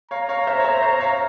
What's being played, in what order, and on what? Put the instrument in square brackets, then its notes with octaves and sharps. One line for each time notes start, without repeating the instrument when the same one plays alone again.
[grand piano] C#5 F5 [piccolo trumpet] A#5
[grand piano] C#5 F5
C5 E5
C#5
C5 E5
C5 E5
C#5 F5